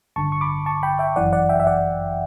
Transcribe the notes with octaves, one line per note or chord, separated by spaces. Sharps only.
A1 G2 D3 A5 C#6
C#6
B5 D6
A5 C#6
G5 B5
E5 G5
G1 F#2 E3 D5 F#5
D5 F#5
E5 G5
E5
D5 F#5